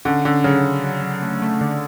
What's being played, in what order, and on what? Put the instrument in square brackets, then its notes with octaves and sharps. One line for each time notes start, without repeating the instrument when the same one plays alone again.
[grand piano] D3 [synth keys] C#4
[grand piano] D3 [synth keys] C#4
[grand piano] C#3 [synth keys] F#3
[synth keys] C#4
F#3
F#3
A3
A3
D3